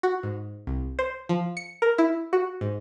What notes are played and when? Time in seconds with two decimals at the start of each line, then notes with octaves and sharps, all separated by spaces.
0.03 F#4
0.23 G#2
0.67 C2
0.99 C5
1.29 F3
1.57 C#7
1.82 A#4
1.98 E4
2.33 F#4
2.61 G#2